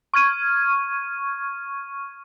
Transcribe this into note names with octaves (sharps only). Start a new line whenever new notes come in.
C#6 F6 G#6 D#7